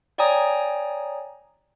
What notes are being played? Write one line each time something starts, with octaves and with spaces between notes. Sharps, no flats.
C#5 D5 G5 G#5 A#5 D#6